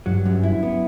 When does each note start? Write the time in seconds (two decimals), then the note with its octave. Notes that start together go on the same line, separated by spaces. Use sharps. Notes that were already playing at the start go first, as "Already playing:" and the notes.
0.06 G2 F#3
0.25 F#2
0.43 E4
0.63 B3